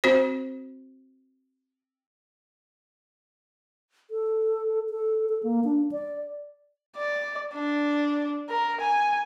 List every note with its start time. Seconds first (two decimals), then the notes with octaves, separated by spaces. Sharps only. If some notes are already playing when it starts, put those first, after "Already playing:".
0.04 C4 F#4 C5
4.11 A4
4.90 A4
5.29 A4
5.43 A#3
5.64 D4
5.92 D5
6.97 D5
7.53 D4
8.50 A#4
8.81 G#5